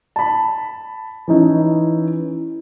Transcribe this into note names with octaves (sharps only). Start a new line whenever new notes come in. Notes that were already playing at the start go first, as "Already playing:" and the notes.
A5 B5
E3 C#4 D#4 E4